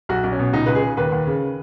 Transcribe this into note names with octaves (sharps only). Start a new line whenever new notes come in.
B1 F#4
B1
C#4
B2
C#2 D#4
C#2 B4
G#4
C#3
D#2 B4
D#2
C#3